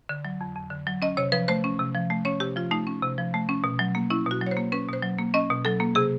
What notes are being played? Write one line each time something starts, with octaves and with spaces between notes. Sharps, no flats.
D3
F#3
F2
F2
D3
F#3
C#4 D#5
C3 C#5
F3 B4
A3 C5
C#4
C3
F3
A3
C#4 C#5
C3 G4
F3 F4
A3 D#4
C#4
C3
F3
A3
C#4
B2
F#3
A#3
C#4 E4
B2 F#4
F#3
C#5
C5
A#3
C#4 B4
B2 C5
F#3
A#3
C#4 D#5
B2
F#3 A4
A#3
C3 G#4